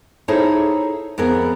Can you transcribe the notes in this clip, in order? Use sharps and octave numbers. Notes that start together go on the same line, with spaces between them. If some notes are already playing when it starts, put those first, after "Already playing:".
D#4 E4 G#4 A4 C5 C#5
F2 B3 G#4 A#4